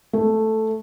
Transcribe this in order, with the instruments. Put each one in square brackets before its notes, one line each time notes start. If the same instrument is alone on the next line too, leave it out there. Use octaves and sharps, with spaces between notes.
[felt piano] A3